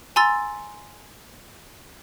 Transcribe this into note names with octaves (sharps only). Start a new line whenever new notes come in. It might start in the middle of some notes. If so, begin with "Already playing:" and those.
G#5 A#5 C6 E6 A6